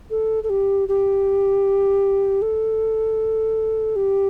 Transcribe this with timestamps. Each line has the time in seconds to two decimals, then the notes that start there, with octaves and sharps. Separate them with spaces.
0.10 A4
0.43 A4
0.50 G4
0.88 G4
2.42 A4
3.96 G4